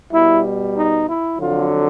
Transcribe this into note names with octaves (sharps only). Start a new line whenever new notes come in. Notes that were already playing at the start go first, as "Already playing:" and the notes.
B2 G3 E4
D#4
E4
F2 D3 F#3 F4